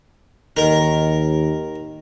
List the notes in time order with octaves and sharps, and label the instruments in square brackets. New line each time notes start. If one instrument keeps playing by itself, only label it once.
[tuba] D#2 [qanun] D#3 [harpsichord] A#4